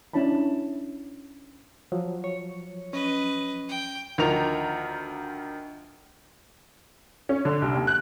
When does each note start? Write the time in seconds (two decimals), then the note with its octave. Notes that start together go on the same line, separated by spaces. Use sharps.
0.14 C#4 D4 E4 C#5 A5 B5
1.92 F3 F#3
2.24 C#5
2.93 C#4 B4 D#5
3.69 G5
4.18 D2 D#3 F3 A#4 A#5 F7
7.29 C#4
7.45 D3
7.62 C2
7.75 D#2
7.87 F#6